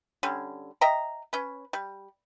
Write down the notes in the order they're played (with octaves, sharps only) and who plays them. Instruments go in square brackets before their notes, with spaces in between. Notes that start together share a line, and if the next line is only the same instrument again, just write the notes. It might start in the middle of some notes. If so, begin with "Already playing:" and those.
[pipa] D3 G3 C#4
D#5 E5 G5 A#5
C#4 B4
G3